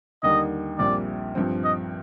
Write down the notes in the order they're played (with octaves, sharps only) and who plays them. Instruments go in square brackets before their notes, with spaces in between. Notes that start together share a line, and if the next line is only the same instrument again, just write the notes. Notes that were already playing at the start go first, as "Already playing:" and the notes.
[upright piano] D#2 D3 G3 A#3 D#4 [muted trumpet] D#5
[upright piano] A#1 A#2 G3 C4 [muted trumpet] D5
[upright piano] G2 F3 C4
[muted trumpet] D#5